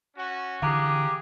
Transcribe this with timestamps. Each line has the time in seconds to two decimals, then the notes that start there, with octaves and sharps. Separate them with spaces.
0.17 C#4 F#4
0.62 D3 E3 G4 G#4 F5 A#5 D6 F#6